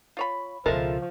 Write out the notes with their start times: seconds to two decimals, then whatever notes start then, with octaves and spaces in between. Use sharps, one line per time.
0.17 F4 C#5 B5
0.66 C#2 B2 F3 G#3 F4 A4 A#4 E5